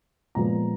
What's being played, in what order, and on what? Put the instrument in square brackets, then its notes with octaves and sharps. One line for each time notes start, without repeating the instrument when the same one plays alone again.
[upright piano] A#2 F3 G#3 B3 A#5